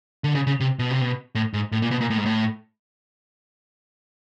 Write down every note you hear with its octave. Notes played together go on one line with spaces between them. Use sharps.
D3
C#3
C#3
C3
B2
C3
B2
A2
G#2
A2
A#2
B2
A#2
A2
G#2
A2